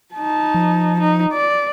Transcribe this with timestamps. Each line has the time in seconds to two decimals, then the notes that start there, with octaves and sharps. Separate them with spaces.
0.15 D#4 A5
0.54 F3
1.00 D#4
1.33 D5